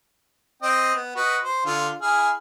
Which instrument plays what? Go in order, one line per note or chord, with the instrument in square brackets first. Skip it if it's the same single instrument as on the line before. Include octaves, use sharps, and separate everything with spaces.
[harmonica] C4 D#5 G5
B3
F#4 B4 D#5
C5
D3 F4
E4 G#4 F6